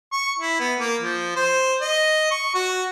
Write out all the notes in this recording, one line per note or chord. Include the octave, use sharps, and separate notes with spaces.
C#6
E4
B3
A#3
F3
C5
D#5
C#6
F#4